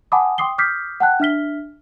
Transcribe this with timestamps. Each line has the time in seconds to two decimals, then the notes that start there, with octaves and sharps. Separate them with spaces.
0.12 F#5 G#5 A5 B5 D6 D#6
0.38 G5 C6 D6 D#6 C7 G7
0.58 D6 D#6 F6 G6 B6 C7
1.00 F#5 G5 A5 F#6
1.20 D4 E5 F6 B6 G7